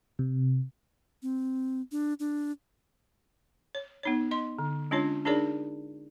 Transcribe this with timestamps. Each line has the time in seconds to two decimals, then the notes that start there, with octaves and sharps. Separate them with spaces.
0.19 C3
1.22 C4
1.92 D4
2.20 D4
3.75 C#5
4.03 B3 D#4 C#5
4.31 D#5 C6
4.59 D3
4.91 G#3 C#4 D4 F4 C#5
5.25 D4 D#4 G#4 A#4 C#5 D5